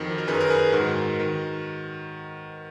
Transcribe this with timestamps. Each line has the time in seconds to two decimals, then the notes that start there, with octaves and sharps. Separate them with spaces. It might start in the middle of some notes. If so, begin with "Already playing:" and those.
Already playing: F2 D#3 F#4 A#4
0.18 A#4
0.28 F#2 D#3 G#4 B4
0.40 A#4
0.50 G#4 B4
0.72 G#2 D#3 F#4 A#4
1.19 D#3